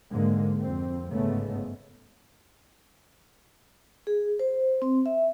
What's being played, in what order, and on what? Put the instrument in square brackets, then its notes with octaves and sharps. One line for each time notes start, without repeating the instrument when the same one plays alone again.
[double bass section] G#2 D3 G#3 A#3
F2 C4
G1 G#2 C#3 G#3 A3 B3
[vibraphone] G#4
C5
C4
E5